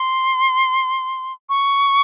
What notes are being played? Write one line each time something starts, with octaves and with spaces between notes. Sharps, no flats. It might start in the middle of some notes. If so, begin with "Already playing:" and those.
Already playing: C6
C#6